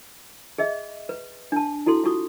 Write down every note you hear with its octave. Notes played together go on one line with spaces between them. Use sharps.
G#4 D#5 E5
B4
D4 A5
E4 F#4 A4 C6
F4 F#4 C#6 D#6